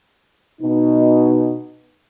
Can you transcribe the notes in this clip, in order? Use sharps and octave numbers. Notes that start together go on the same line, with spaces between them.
B2 D#4